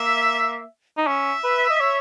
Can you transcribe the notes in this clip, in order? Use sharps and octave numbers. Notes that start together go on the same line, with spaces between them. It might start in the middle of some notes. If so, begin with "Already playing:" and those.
Already playing: A#3 E5
D#4
C#4 E5
B4
D#5
C#5